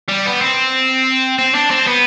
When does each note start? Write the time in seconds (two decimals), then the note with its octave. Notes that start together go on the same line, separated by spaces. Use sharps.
0.08 G3
0.26 B3
0.41 C4
1.39 C4
1.55 D4
1.71 C4
1.87 B3